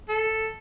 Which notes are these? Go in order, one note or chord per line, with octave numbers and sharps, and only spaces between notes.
A4